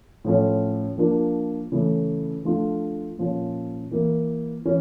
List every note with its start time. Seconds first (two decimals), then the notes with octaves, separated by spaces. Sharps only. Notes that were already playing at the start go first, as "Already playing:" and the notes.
0.25 A2 F3 C#4
0.98 F3 A#3 D4 F4
1.72 C#3 E3 A3
2.45 F3 A3 D4 F4
3.18 A#2 F3 C#4
3.91 E3 A#3 E4
4.65 E3 C#4